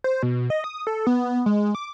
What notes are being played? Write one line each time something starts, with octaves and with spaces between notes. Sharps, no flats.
C5
B2
D#5
D#6
A4
B3
G#3
D6